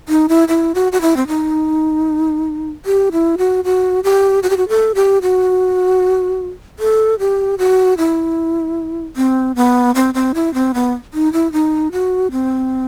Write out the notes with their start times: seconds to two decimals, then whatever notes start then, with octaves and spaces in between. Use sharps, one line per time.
0.09 D#4
0.29 E4
0.48 E4
0.75 F#4
0.92 F#4
1.01 E4
1.17 C4
1.28 D#4
2.86 G4
3.12 E4
3.38 F#4
3.64 F#4
4.04 G4
4.43 F#4
4.50 G4
4.57 F#4
4.69 A4
4.95 G4
5.22 F#4
6.79 A4
7.19 G4
7.59 F#4
7.98 E4
9.16 C4
9.56 B3
9.95 C4
10.14 C4
10.34 E4
10.54 C4
10.74 B3
11.14 D#4
11.33 E4
11.53 D#4
11.92 F#4
12.32 C4